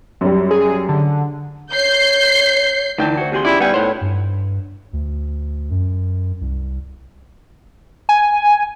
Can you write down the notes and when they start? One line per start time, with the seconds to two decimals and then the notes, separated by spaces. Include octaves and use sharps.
0.21 F#2 G3
0.51 G#4
0.89 D3
1.72 C#5 G6 C7
2.98 D2 D#3 E3 A3 D#4 G5 A5
3.17 F#4 C5 G#6
3.32 E2 G4 G#4 C6 G6 F#7
3.45 C#4 E4 F4 G4 D5
3.60 G3 B3 D#4 B4 D5 F#5 G#5
3.74 A2 C5 C#5 F#5
4.01 G2
4.93 D2
5.71 F#2
6.41 C2
8.09 G#5